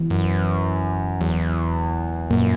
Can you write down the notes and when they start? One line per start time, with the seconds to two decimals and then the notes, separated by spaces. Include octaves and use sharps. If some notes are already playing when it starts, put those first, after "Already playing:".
Already playing: E3
0.10 F#2
1.20 E2 F#3
2.30 F#2 A#2 A#3